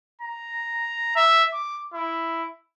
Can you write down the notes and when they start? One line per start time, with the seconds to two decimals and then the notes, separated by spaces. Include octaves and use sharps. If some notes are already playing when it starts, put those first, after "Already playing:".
0.22 A#5
1.16 E5
1.53 D6
1.94 E4